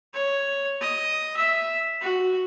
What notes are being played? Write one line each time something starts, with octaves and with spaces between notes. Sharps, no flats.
C#5
D#5
E5
F#4